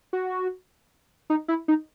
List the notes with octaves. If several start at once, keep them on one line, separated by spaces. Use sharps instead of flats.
F#4
D#4
E4
D#4